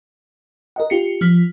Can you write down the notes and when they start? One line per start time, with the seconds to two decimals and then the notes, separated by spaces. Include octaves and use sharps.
0.76 A#4 D#5 F#5
0.90 F4 G4 C7 C#7
1.21 F3 F6 B6